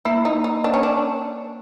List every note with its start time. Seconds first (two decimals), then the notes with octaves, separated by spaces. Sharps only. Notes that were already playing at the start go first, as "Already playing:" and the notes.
0.05 A#3 E4
0.25 D#4
0.44 D#4
0.64 D4
0.74 C#4
0.83 D4